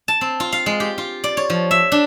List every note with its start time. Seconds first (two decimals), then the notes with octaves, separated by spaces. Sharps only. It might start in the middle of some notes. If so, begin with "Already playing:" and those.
0.08 A5
0.21 C4
0.40 F4
0.52 F5
0.66 G#3
0.80 G4
0.98 F4
1.24 D5
1.37 C#5
1.50 F3
1.71 E5
1.92 D4